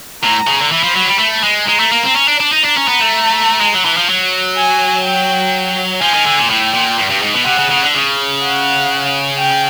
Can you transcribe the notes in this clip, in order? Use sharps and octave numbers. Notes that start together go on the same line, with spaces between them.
A2 A#5
C#3
D3
E3 B5
F3
F#3
G3
A3
G#3
G#3 A#5
A3
A#3
C4
C#4
D4
D4
D#4
D4 A#5
C#4
B3
A3
G#3
F#3
E3
F3
F#3
G#5
G5
F3 G#5
D#3
D3
A#2
A2 G5
A#2
G2
G2
G#2
B2
C3 F#5
C#3
C#3
D3
C#3
F#5
G5